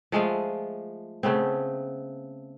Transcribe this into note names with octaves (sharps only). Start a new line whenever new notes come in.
F3 G#3 A3 F4
C#3 A3 B3 C4